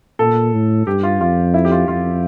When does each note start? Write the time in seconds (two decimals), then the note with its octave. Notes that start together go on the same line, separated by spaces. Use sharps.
0.19 A#2 A4
0.53 A2
0.87 G2 G4
1.03 F4
1.21 F2 F4
1.54 E4
1.65 G4
1.72 F4
1.88 F2 F4